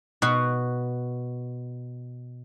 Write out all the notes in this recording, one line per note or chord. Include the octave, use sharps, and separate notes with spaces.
B2 F#4